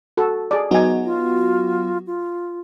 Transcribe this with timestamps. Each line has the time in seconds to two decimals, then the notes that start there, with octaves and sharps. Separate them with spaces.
0.17 F#4 A4
0.51 G#4 D5
0.71 F#3 B3 D#4 F#4 G#5
1.05 F4
2.07 F4